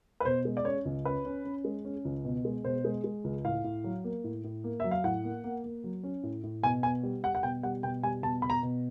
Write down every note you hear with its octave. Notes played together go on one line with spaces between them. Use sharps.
B4
B2 C5
G#3
D5
C#4 C#5
C#2
C#4 B4
C#4
C#4
G#3
C#4
C#2
B2
G#3
B2 C5
G#3
G#3
C#2
A2 F5
A2
F#3
A#3
A2
A2
A#3
F#3 E5
F5
A2 F#5
A#3
A#3
A#3
F#3
C#4
A2
A2
B2 G#5
B3 G#5
G3
G3 F#5
F#5
B2 G5
G3 F#5
B2 G5
G3 G#5
B2 A5
B2 B5
A#5
B2